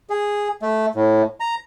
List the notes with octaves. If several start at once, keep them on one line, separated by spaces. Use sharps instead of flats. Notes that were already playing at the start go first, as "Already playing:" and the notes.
G#4
A3
A2
A#5